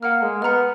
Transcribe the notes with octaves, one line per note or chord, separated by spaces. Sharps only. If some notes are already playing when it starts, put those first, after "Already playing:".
A#3 F#5 A#5 F6
G#3
B3 F#5 A#5 F6